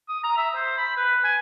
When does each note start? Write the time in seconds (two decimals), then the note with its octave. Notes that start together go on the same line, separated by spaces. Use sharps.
0.08 D#6
0.24 A#5
0.37 E5
0.55 C5
0.77 B5
0.97 B4
1.24 G#5